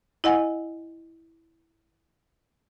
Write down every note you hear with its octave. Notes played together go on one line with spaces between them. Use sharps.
E4 D#5 F#5 G#5